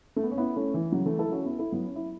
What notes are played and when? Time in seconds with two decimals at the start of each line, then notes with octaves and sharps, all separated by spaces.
0.16 A3
0.23 B3
0.31 C#4
0.37 B3 E4
0.56 A3 C#4
0.74 E3
0.92 C#3 F#3
1.06 E3 A3
1.19 E4 A4
1.32 C#4 F#4
1.45 B3 E4
1.58 E4 A4
1.72 F#3 B3
1.87 C#4
1.96 E4